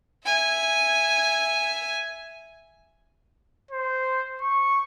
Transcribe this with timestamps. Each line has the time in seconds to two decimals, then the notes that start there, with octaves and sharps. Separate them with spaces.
0.25 E5 G#5
3.71 C5
4.42 C#6